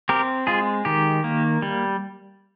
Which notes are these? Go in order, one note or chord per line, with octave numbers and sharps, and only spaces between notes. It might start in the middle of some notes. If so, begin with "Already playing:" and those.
C4 G4 A#4
G#3 F4 G#4
D#3 G4
A#3
G3